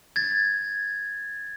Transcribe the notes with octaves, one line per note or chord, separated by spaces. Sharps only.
G#6 A6